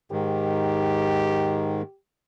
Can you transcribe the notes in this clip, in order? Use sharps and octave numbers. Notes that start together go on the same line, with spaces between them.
G#2 D#3 G4